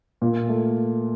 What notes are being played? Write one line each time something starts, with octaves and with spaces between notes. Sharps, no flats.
A#2
A3